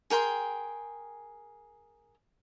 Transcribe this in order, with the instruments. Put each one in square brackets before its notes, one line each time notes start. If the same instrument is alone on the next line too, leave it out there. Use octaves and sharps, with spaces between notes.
[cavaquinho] G#4 A#4 G5 C6